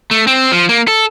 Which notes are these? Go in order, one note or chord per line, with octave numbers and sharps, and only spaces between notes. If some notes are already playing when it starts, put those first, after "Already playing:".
A3
C4
F3
A#3
A4